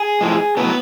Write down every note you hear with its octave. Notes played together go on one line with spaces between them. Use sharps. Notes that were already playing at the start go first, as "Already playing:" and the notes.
Already playing: G#4
A2 F3 G#3
A2 F#3 B3 B4